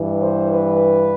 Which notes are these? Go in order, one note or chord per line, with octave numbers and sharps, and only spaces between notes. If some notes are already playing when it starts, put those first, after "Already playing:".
Already playing: G2 E3
C5
B4